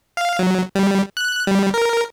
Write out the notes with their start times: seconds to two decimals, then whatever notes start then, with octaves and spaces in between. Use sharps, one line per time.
0.17 F5
0.39 F#3
0.75 G3
1.17 F#6
1.47 G3
1.74 A#4